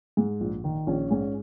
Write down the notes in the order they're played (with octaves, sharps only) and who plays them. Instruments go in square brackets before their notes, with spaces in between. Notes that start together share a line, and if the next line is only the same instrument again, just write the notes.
[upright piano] G#2
A#1
D#3
A#1 C#4
G#2 C#4